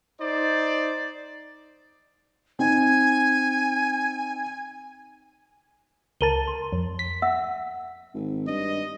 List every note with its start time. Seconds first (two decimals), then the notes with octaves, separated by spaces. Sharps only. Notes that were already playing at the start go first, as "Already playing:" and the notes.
0.20 D#4 C5 D5
2.59 C4 D#4 G#5
6.21 C#2 A#4 A5 D#7 G7
6.48 C6
6.72 F2
6.99 B6
7.22 E5 F#5 E6
8.14 G#1
8.47 G2 D#5